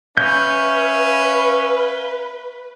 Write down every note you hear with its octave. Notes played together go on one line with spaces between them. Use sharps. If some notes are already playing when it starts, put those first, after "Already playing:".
C#4 B4 E5 F5 G6